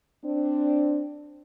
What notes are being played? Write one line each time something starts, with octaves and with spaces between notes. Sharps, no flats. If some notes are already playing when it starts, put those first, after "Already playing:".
C4 D4